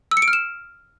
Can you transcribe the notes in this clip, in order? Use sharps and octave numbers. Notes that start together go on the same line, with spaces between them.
E6
C#7
D7
F6
E7